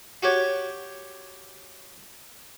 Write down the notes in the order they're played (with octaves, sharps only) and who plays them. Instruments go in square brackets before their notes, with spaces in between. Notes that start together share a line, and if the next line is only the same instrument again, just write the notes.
[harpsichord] F#4 G4 C#5